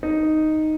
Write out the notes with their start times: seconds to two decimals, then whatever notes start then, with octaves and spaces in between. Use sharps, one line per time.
0.03 D#4